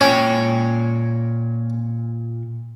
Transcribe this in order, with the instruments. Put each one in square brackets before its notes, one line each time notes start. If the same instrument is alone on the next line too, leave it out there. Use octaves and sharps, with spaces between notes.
[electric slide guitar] A#2 C#5 G5 [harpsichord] C#4